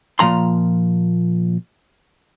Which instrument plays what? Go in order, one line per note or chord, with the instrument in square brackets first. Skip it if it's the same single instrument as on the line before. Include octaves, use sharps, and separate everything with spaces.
[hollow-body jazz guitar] A#2 F3 A#5 C6